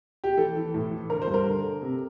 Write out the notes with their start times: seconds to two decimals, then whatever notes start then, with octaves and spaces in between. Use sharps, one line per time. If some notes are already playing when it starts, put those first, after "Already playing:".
0.24 G4
0.37 E3 A4
0.56 E3
0.74 A2
0.91 E3
1.10 D3 A#4
1.22 C5
1.28 G2
1.34 A#4
1.46 D3
1.64 D3
1.82 C3